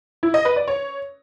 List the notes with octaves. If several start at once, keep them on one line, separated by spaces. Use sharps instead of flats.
E4
D#5
B4
D5
C#5